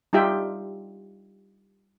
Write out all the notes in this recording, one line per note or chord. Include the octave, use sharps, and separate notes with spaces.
G3 D#4 F4 G4 E5 G5